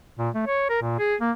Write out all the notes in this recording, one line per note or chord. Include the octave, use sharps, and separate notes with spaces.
A#2
A3
C#5
A#4
A#2
G#4
A#3